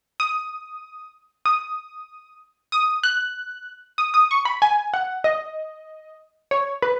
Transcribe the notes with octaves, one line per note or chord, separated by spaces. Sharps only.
D#6
D#6
D#6
F#6
D#6
D#6
C#6
B5
G#5
F#5
D#5
C#5
B4